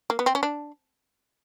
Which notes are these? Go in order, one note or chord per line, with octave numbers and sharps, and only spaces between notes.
A#3
B3
C4
C#4
D4